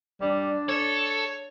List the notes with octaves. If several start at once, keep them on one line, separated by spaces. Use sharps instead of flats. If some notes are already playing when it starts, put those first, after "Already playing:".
G3 D4
A4 C#5